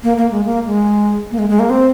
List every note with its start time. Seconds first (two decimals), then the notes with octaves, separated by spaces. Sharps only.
0.03 A#3
0.17 A#3
0.31 G#3
0.45 A#3
0.66 G#3
1.31 A#3
1.39 G#3
1.49 G#3
1.59 A#3
1.70 C4